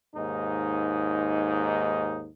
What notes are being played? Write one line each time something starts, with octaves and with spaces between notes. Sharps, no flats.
D#2 G#2 D#4